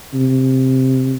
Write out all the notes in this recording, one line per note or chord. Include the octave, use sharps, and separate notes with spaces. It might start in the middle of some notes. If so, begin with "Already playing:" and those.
C3